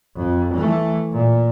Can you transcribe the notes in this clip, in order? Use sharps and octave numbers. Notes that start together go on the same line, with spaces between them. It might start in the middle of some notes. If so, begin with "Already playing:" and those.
F2
E3 A3
A#2